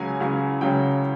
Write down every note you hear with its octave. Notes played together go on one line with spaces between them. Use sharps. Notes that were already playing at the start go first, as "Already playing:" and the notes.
Already playing: C#2 C#3 F#3 G#5
C#2 C#3 F#3
C#2 C#3 F#3 G5